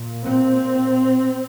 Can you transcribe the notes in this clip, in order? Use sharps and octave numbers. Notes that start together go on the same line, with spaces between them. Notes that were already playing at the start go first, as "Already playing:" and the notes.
Already playing: A#2
C4